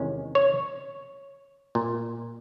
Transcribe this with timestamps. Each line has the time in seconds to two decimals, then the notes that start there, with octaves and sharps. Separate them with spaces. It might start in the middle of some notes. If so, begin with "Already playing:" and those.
Already playing: E2 C3 D#3 G#3 C#4
0.35 C#5
1.75 A#2